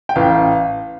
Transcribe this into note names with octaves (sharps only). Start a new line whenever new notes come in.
G5
A1 F5